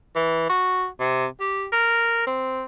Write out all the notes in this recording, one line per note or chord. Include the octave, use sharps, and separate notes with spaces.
E3
F#4
C3
G4
A#4
C4